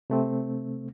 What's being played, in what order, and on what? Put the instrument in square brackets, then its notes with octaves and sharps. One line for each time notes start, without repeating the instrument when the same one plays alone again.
[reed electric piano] C3 A3 C4